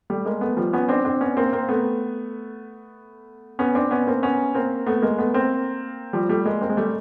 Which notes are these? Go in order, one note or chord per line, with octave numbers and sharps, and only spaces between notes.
G3 A3
G#3 A#3
A3 B3
F3 G3
B3 C#4
C4 D4
C4 D4
B3 C#4
A#3 C4
A#3 C4
A3 B3
B3 C#4
C4 D4
B3 C#4
A#3 C4
B3 C#4
A#3 C4
A3 B3
G#3 A#3
A3 B3
A#3 C4
F3 G3
G3 A3
G#3 A#3
A#3 C4
G#3
G3 A3